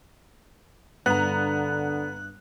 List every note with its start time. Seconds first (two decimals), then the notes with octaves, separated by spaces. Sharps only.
1.06 G2 D3 B3 A#5 F#6